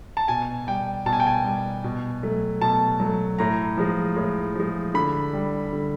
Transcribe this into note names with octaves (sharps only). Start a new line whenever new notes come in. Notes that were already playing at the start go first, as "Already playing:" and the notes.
A5
B2 G#5
G3 G5
B2 A5
G#5
G5
G#5
G3
B2
F#3 A3
B2 A5
F#3 A3
A2 A#5
F3 G#3
A2
F3 G#3
D3 B5
G3
D3